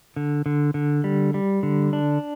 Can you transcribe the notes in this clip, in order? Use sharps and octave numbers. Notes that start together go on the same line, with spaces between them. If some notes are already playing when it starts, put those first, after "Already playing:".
D3
D3
D3
G3
G3
D3
D4